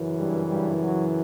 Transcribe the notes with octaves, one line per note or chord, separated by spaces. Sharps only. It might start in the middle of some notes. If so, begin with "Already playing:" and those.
Already playing: F#2 C#3 E3
G2 G3
G2 G3
F#3